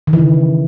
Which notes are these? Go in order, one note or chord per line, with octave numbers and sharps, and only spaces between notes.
D#3
E3
C#3